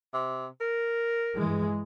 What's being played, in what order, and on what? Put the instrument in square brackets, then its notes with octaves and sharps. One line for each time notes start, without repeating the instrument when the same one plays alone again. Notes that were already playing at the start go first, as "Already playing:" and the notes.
[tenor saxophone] C3
A#4
[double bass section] G2 E3 G#3